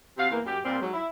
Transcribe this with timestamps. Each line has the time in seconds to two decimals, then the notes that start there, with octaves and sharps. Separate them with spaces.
0.18 C3 F#4 F5
0.30 E2 E3 A#3
0.45 F#2 G4
0.64 A#2 G3 A#3 C4
0.80 G#2 F#3
0.93 E4